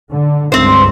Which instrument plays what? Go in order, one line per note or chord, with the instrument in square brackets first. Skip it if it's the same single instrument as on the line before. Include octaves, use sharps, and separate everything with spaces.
[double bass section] D3
[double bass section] C#2 G2 [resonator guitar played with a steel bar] C4 C5